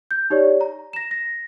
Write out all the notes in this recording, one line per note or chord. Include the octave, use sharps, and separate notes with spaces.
G6
D#4 G4 C#5 D5
A#5
A#6 E7
A#6